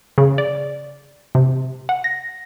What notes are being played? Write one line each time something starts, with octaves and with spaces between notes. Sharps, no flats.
C#3
D5
C3
F#5
A#6